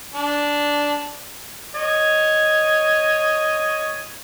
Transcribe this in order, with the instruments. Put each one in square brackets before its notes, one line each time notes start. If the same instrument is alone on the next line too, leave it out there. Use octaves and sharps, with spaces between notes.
[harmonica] D4
C#5 D#5